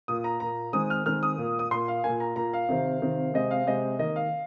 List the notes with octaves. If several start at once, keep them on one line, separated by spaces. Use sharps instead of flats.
A#2 A#3 D#6
A#5
A#2 A#3 A#5
D#3 G#3 C4 D#6
F6
D#3 G#3 C4 F6
D#6
A#2 A#3
D#6
A#2 A#3 C6
F5
A#2 A#3 G#5
A#5
A#2 A#3 A#5
F5
C3 D#3 C4
C3 D#3 C4
C3 G#3 C4 D#5
F5
C3 G#3 C4 D#5
D#3 A#3 D#5
F5